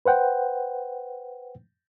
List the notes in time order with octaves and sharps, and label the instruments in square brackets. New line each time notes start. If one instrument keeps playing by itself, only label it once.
[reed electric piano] B4 C5 F#5 G5